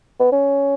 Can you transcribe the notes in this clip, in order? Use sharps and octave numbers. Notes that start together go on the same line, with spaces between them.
B3
C#4